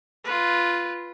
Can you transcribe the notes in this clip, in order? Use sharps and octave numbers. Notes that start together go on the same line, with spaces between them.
F4 B4